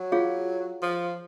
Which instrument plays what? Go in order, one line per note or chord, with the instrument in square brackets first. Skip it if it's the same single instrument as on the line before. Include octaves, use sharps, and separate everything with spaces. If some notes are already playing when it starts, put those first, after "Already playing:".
Already playing: [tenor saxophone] F#3
[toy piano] F4 G#4 C#5 F5
[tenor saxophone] F3